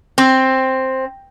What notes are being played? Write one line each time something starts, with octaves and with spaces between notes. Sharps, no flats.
C4